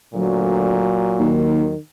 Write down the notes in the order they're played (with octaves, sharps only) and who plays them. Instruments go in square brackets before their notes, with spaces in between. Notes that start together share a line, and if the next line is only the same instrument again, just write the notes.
[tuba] D2 [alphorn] A#2 [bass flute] F#3
[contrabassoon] D#2 [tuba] D#3